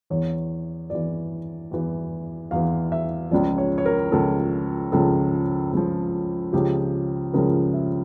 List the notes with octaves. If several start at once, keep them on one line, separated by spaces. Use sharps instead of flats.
E2 E3 C#5
E2 E3 D5
E2 E3
E2 E3 F5
E5
C#2 C#3 F3 D5
C#5
C#5
A#4
C#2 C#3 F3 A4
C#2 C#3 F3 A4
C#2 C#3 F3
C#2 C#3 F3 G4
C#2 C#3 F3 A#4
E5